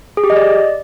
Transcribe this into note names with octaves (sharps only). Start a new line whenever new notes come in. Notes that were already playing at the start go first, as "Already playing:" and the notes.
G#4
G4
D#5
D5